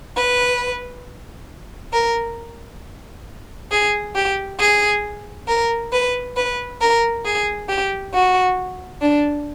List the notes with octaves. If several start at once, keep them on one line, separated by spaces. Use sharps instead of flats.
B4
A#4
G#4
G4
G#4
A#4
B4
B4
A#4
G#4
G4
F#4
D4